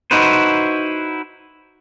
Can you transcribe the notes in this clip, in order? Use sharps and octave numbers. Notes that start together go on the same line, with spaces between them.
D#4 E4 F#4 B4 C5